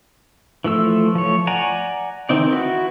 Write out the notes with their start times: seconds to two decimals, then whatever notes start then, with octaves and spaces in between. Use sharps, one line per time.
0.64 E3 F3 A3 E6
1.15 F3 A3 C#5
1.47 D5 F#5 G#5 A#5
2.29 D#3 E3 C4 D#4 D5
2.52 E4 F#4 B4